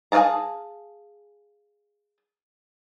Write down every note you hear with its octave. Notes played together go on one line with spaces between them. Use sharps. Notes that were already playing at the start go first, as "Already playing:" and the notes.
G#4 B4 F5 A5 A#5